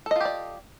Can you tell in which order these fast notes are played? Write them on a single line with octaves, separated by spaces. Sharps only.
A4 D#5 F4 G4 D5